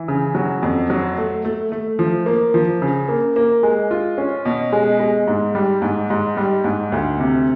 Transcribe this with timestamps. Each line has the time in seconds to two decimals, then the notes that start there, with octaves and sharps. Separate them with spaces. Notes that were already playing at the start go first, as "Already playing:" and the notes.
Already playing: E3
0.08 C#3
0.35 F#3
0.63 F2
0.90 F#3
1.18 A3
1.45 A3
1.72 A3
1.99 F3
2.26 A#3
2.54 F3
2.82 C#3
3.09 A#3
3.36 A#3
3.63 G#3
3.91 F4
4.18 C#4
4.45 B2
4.72 G#3
5.00 G#3
5.28 G#2
5.55 G3
5.82 G#2
6.10 G#2
6.37 G3
6.64 G#2
6.92 D2
7.20 C3